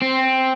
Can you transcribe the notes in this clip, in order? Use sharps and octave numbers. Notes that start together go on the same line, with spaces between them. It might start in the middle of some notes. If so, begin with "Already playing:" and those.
C4